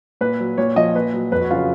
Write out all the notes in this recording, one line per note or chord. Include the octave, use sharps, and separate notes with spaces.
A#2 B4
F#3
A#2 C#5
F3 D#5
A#2 B4
F#3
F2 B4
F#4
C#3 F#3 F4